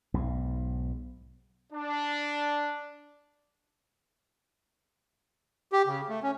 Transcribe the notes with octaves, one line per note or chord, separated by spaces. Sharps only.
B1 G#2
D4
G4
C#3
A3
C#4